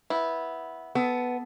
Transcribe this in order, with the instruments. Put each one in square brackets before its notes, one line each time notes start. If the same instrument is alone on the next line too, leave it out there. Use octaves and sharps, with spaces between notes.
[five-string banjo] B3 E4
[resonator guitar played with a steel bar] B3 [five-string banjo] A4